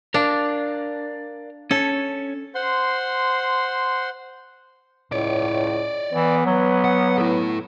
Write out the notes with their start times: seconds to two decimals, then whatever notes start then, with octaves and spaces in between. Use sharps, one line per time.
0.14 D4 A#4 D5 F5
1.71 C#4 A4 C#5
2.55 C5 F#5 C6
5.12 C#2 A2 C#5 D5
6.13 E3 B3
6.46 F#3
6.85 F#5
7.18 E4 A4